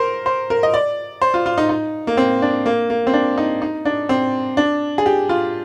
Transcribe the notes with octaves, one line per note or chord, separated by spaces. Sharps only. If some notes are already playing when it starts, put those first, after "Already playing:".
Already playing: A#4 C5
C5
A#4
D#5
D5
C5
F4
F4
D#4
D#4
A#3
C4
D4
A#3
A#3
C4
D4
D#4
D#4
D4
C4
D4
G#4
G4
F4